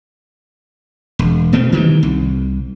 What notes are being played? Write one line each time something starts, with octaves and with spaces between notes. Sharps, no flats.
E1
B2 A3 C4
D#3 E3 G3
C2